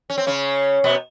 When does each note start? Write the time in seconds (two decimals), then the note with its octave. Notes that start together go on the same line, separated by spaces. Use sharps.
0.10 C#4
0.18 C4
0.27 C#3 C#4
0.84 B2 B3